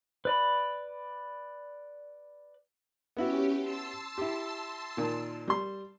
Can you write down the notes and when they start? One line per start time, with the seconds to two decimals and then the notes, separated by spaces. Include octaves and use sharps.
0.25 B4 D5 B5
3.17 B3 C#4 E4 F#4 G4
3.61 A5 C6 E6
4.18 E4 G4
4.97 A#2 D#3
5.48 G3 C6